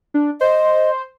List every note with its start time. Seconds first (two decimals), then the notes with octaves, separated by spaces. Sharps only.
0.14 D4
0.41 C5 D#5